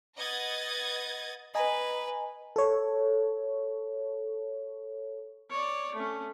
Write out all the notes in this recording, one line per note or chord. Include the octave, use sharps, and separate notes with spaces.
B4 D#5 F#5 D#6 G#6 A6
B4 D#5 G#5 A#5
A4 C#5
C#5 D5
A3 C#4